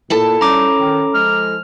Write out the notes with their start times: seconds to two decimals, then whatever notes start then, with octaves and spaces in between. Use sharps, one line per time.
0.10 A#2 E4 A4 A5
0.41 G3 C#4 D#4 A#5 D6
0.80 D#3
1.13 F3 G#3 F6